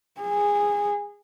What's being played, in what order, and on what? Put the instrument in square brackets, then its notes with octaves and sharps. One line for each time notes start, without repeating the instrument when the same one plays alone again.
[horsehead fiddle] G#4